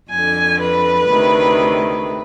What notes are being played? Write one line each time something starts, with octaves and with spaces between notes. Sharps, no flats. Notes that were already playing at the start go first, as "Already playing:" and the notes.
F2 D3 G#5
B4
D2 C3 D#3